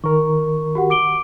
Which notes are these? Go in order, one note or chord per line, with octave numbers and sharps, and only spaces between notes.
D#3 A#4 C#6
F#4 G4 F#5
D6 D7 G7